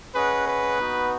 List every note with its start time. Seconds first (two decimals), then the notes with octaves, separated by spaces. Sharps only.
0.15 C#4 G#4 B4 D#5 F#5
0.47 B4
0.79 B3 D#4 F#4